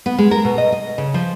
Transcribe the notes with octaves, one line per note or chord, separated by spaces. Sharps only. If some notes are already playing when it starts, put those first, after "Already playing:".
B3
G#3
A#4
B2
D#5
D#5
C#3
F3